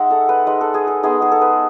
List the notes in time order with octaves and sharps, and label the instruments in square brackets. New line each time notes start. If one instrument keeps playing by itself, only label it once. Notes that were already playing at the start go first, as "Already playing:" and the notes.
Already playing: [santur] G#3 D#4 E5 F#5
A4
B4
G#3 D#4 B4
A4
G#4
A4
G#3 B3 D#4 G#4
G#4
A4
B4